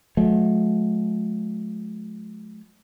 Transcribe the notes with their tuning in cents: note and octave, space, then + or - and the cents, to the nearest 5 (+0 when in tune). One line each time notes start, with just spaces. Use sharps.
F#3 -40 A3 -45